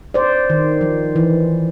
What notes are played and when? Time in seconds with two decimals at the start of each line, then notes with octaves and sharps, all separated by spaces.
0.14 C5 D5
0.50 D#3
0.81 F3
1.16 E3